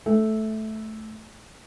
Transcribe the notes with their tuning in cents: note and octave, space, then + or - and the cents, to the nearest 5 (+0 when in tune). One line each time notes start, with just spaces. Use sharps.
A3 -10